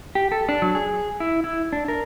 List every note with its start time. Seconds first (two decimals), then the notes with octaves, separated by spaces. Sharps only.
0.15 G4
0.32 A4
0.49 D4
0.62 F#3
0.75 G#4
1.20 E4
1.44 E4
1.73 D4
1.88 A#4